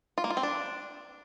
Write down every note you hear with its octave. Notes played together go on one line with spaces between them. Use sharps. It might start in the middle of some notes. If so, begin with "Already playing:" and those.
F4
A#3
F4
C4
D4